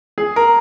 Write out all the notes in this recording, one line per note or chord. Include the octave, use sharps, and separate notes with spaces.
G#4
A#4